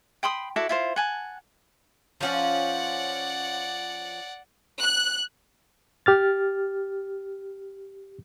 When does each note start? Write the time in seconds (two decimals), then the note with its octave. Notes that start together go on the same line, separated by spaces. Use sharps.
0.23 G5 B5 C6 D#6
0.56 E4 F#4 A4 D5
0.69 E4 F4 C5
0.96 F#5 G#5 A5
2.21 F3 C#4 F4 D5 F#5
4.82 F#6
6.06 G4 F6 A6